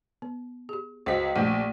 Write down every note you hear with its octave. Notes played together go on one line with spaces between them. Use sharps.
B3
G4 G#4
C#2 F#4 C5 B6
A#1 A3 A#3 G4